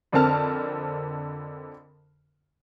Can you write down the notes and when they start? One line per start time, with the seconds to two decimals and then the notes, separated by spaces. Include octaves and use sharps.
0.12 F2 D3 C4 A#4 A5 F6